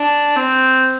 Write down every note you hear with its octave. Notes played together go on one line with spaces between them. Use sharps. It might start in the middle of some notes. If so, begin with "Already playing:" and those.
Already playing: D4
C4